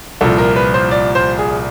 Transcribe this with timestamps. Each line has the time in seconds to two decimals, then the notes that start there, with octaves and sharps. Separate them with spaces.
0.21 C2 A#2 F3 A4
0.38 A#4
0.56 B4
0.74 C5
0.91 D5
1.15 C5
1.38 G#4